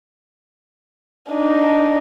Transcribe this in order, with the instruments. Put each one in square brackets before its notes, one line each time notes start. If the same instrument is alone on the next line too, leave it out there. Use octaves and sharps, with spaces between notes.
[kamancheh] D4 D#4